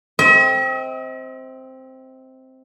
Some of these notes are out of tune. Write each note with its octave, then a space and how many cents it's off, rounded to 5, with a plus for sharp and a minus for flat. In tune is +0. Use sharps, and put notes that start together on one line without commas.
C4 +0 D#5 +45